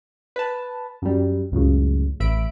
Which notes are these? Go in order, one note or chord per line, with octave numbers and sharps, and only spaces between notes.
B4 A5
F#2 G3
C#2 F#2 A2 C#3
A1 E5 B5 D7